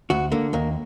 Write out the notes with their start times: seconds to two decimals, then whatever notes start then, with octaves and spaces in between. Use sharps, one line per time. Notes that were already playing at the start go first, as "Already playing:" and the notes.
0.10 D2 F#4
0.32 D3 A#3
0.53 D#2 A#3